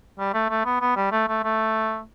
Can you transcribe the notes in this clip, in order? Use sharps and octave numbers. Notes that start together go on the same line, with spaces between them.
G3
A3
A3
B3
B3
G3
A3
A3
A3